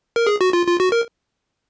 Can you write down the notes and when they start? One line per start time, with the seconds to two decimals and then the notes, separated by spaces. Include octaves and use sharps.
0.16 A#4
0.27 G#4
0.41 F#4
0.53 F4
0.67 F4
0.80 F#4
0.92 A#4